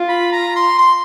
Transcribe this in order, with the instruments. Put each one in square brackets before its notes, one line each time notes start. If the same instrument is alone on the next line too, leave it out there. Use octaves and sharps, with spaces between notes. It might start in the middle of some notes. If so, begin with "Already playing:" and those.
Already playing: [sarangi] F4
[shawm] B5
A#5
C6
C6